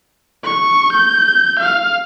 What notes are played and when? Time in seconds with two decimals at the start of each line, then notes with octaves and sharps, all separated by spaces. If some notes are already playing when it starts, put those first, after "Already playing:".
0.44 C#6
0.93 G6
1.60 F5